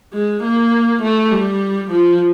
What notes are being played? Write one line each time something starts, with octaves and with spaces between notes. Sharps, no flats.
G#3
A#3
A3
G3
F3